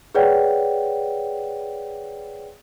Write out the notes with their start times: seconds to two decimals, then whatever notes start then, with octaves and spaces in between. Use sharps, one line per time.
0.15 G#4 B4 C#5 D5 F#5 G5